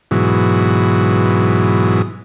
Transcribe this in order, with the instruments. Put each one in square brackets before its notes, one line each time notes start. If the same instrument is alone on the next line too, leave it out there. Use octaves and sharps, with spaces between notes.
[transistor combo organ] G#2 B2 E3 F#3